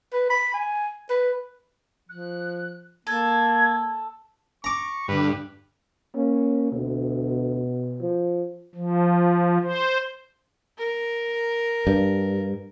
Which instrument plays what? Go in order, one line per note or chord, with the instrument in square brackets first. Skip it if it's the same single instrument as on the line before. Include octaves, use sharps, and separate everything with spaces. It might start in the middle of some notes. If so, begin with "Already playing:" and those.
[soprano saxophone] B4
B5
G#5
B4
[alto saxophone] F3 [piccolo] F#6
[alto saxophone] A#3 [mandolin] A4 [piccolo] G#6
[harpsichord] A#5 D6 [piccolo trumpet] C#6
[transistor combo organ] G2 [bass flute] D3 [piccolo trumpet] B4
[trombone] A#3 [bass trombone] C#4
[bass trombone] D2 [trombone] B2
[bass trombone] F3
[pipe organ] F3
C5
[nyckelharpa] A#4
[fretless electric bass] G2